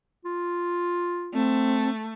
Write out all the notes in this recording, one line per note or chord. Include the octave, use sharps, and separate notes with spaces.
F4
A3 C4